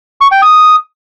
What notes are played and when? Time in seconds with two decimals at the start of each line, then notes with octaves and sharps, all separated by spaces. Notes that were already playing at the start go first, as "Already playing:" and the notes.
0.21 C#6
0.31 G5
0.42 D#6